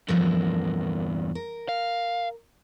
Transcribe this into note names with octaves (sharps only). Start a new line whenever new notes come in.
E2 G2 F3 A4 A#4
A#4
F5